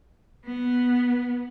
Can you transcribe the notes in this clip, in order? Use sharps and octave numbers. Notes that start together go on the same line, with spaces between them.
B3